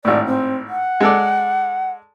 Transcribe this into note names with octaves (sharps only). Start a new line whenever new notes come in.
G#1 A2 D5
C4
F#5
G#3 A4 D5